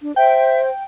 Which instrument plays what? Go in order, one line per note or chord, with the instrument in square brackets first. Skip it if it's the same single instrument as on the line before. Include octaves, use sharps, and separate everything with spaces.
[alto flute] D4
[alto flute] C5 [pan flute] E5 [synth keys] G5